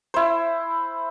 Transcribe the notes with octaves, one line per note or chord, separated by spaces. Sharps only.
E4 C5